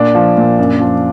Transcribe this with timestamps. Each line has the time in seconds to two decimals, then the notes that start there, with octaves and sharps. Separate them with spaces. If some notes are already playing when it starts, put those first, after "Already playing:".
Already playing: A#2 D4
0.15 F3
0.37 A#2
0.59 F#2
0.80 F3